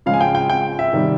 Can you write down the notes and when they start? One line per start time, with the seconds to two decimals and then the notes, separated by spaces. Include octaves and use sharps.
0.06 C#3 F3 G#3 F5
0.14 G#5
0.21 G5
0.35 G5
0.49 G5
0.79 E5
0.93 C3 D#3 G3